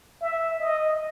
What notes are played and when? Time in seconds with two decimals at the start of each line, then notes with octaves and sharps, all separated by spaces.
0.21 E5
0.60 D#5